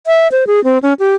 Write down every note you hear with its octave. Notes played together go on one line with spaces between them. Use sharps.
E5
C5
G#4
C4
C#4
G4